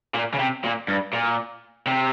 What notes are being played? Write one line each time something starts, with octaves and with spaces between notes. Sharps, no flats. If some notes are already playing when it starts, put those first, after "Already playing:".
A#2
C#3
C3
A#2
G2
A#2
C3